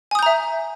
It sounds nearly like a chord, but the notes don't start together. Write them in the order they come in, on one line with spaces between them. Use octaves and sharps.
G#5 D#6 G6 A#5 E5